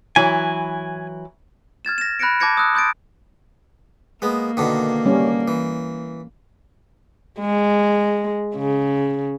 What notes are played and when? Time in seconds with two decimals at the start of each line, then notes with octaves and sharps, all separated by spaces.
0.16 E3 F#3 E4 G#5
1.85 F6 G#6 A6 E7
1.98 A#6 E7
2.19 B5 F#6 G#6 A#6 C#7 D7
2.40 A5 D6 G6 G#6 A#6 C#7
2.57 D#6 E6 F#6
2.74 C6 D#6 G6 A6 D7
4.22 G#3 A#3 B3
4.57 B2 D3 D#3
5.06 G3 C#4
5.48 E3
7.40 G#3
8.56 C#3